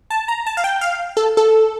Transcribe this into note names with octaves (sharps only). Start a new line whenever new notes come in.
A5
A#5
A5
F5
G5
F5
A4
A4